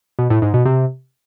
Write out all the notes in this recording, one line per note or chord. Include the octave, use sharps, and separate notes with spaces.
B2
A2
G#2
B2
C3